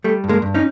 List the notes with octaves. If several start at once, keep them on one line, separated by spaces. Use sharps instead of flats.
G3 A3
G2
G#3 A#3
G2
C#4 D#4